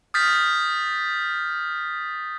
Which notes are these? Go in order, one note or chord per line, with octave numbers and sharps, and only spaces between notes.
D#6 F6 G6 A6 B6